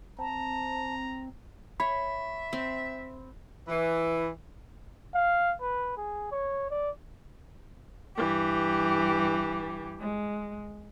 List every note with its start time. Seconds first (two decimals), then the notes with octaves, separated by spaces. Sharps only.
0.19 C4 A5 A#5
1.80 C#5 E5 B5
2.53 C4
3.68 E3
5.14 F5
5.61 B4
5.97 G#4
6.32 C#5
6.70 D5
8.16 G2 E3 G4
10.00 G#3